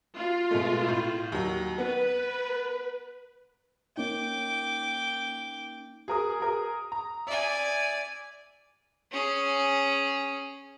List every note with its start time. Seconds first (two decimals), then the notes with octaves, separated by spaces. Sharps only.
0.15 F4
0.51 B2 G#3 A3
0.88 A2
1.32 D#2 F#3
1.78 B3 B4
3.98 A#3 C#4 D#4 G5 D6
6.08 G#4 A#4 D#6
6.40 G#4 A#4 D#6
6.92 A#5
7.27 D5 E5 G#5
9.12 C#4 G#4